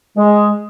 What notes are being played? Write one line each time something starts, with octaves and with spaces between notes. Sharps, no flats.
G#3